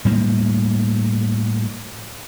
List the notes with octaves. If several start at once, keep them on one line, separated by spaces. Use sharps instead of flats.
A2 G3 A#3